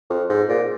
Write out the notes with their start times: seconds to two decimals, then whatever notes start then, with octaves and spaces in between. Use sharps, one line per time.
0.10 F2
0.29 G#2
0.49 A#2